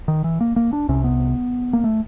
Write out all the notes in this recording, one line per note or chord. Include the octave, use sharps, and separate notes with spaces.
D#3
E3
A#3
A#3
D4
C2 C3 C#4
B3
A#3
A3